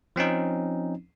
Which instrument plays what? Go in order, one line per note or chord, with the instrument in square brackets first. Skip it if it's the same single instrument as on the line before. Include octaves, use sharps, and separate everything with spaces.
[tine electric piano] F3 C4 C#4 D#4